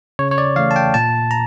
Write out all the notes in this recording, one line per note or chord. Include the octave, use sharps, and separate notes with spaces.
C#3 C#5
C#5
D5
E3 A3 F5
A5
G5
A#2 A5
A#5